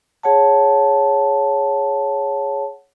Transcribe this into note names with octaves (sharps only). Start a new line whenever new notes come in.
G#4 C#5 F#5 A5